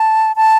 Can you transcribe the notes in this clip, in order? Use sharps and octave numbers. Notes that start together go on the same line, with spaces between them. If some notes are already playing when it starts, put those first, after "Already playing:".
Already playing: A5
A5